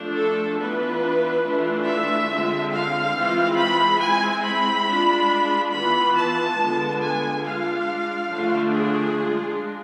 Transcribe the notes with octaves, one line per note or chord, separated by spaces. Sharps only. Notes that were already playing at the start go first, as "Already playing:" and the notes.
Already playing: F3 A3 D4
A4
E3 B3 D4 F4 B4
E3 A3 D4 F4
E5
D3 G#3 C4 F4
F5
E3 G#3 C4 F4
B5
G#3 C4 E4 G#5
B5
G#3 D4 F4
E3 B3 F4 B5
A5
D3 G#3 B3 D4 F4
G#5
G#3 D4 F4 F5
D3 F3 A3 D4 F4
G#4
G#3 D4 F4